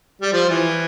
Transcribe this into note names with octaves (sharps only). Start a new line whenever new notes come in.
G3
F3
E3